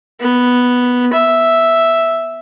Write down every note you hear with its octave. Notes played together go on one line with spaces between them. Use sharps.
B3
E5